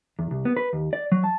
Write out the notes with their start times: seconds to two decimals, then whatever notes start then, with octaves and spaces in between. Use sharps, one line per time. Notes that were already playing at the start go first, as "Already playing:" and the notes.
0.19 E2
0.31 C2
0.45 B3
0.57 B4
0.73 D#2
0.93 D5
1.12 F#3
1.24 A5